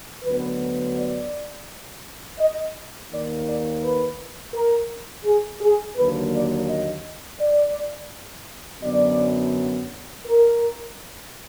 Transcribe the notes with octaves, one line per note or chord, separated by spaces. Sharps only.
D2 D3 F#3 B3 B4
D5
D#5
D#2 D#3 A#3 D5
D5
B4
A#4
G#4
G#4
D#2 D3 F#3 A#3 B4
D5
D#5
D5
F#2 D3 F#3 B3 D5
A#4